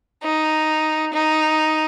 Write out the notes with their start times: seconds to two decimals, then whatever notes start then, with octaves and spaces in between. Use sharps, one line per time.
0.23 D#4
1.14 D#4